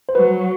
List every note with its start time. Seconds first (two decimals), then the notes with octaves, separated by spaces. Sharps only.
0.09 C5
0.15 F#3 B4